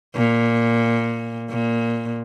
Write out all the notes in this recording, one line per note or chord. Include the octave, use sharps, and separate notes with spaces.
A#2
A#2